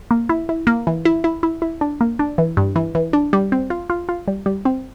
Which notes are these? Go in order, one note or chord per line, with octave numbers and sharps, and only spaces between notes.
A#3
E4
E4
A#3
E3
E4
E4
E4
E4
D4
A#3
D4
E3
G2
E3
E3
D4
G3
C4
F4
F4
F4
G3
G3
C4